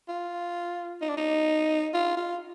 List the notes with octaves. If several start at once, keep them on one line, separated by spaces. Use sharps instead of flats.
F4
D#4
D4
D#4
F4
F4